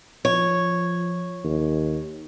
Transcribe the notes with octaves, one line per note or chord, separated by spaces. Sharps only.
F3 C#5
D#2